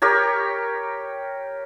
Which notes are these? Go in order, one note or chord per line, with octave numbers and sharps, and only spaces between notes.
G4 A#4 C#5